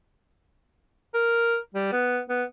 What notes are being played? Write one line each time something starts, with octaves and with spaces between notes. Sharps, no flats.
A#4
G3
B3
B3